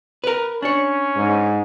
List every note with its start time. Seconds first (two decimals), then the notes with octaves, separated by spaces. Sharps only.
0.24 A#4 B4
0.63 C#4 D4 C#5
1.16 G#2